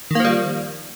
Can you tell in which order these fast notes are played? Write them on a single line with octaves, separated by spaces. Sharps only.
D#3 A#3 F3 G3